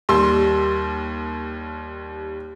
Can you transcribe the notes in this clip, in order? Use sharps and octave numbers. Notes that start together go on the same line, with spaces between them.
D#2 G3 C6 E6